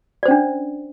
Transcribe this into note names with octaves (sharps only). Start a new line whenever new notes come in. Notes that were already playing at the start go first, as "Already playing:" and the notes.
C#4 D4 C5 D5